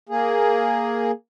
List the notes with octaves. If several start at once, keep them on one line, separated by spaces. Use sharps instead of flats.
A#3 G#4